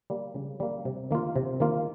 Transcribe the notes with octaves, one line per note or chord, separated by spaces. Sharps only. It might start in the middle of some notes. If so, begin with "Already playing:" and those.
G3 A#3
C#3
G3 A#3
C3
D#3 A#3 F4
C3
D#3 A#3 F4